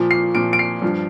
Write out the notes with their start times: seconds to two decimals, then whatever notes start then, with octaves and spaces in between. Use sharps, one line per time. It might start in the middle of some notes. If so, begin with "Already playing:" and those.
Already playing: A#2 F3
0.11 C7
0.35 A#2 F3 D7
0.53 D7
0.59 C7
0.82 G2 F3